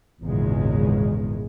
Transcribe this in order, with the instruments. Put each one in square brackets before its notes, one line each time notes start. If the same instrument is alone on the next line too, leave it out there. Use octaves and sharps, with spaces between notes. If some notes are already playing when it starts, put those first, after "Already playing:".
[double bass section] G#1 E2 A#2 C#3 G#3